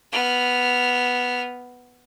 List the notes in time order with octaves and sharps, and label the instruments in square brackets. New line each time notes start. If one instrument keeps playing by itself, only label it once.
[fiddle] B3 F6